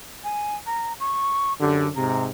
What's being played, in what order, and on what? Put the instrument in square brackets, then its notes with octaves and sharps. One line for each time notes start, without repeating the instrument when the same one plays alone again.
[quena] G#5
A#5
C#6
[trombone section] F#2 D3 [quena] G4
[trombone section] G#2 C3 [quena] A#5